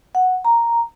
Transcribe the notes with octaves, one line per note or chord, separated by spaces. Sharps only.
F#5
A#5